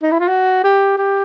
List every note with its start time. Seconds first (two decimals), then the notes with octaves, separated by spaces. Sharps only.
0.03 D#4
0.12 E4
0.20 F4
0.28 F#4
0.64 G4
0.98 G4